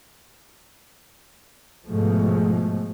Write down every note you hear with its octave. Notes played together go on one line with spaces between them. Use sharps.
G#2 B2 F3 G#3 A3